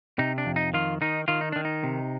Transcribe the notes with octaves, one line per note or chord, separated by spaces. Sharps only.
C3 D#4
D4
F2
D#4
D#3 F4
D#3 D#4
D#3 F4
D#4
D#3 D4
D#4
C3